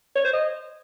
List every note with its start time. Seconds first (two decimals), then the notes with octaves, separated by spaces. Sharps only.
0.16 C#5
0.24 C5
0.33 D#5